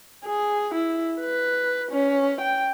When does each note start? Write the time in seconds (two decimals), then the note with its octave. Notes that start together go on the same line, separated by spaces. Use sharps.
0.24 G#4
0.74 E4
1.21 B4
1.91 C#4
2.41 G5